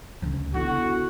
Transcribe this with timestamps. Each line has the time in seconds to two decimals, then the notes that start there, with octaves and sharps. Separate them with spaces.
0.22 D2 C#3
0.54 D3 B3 E4 F#4 A4